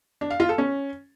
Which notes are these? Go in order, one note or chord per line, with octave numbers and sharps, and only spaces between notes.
D4
F5
F4
A4
C#4